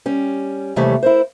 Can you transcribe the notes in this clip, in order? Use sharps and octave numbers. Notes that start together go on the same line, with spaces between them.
G3 C#4
D#2 C3 E3 G3 A3 C#5
E4 A#4 C5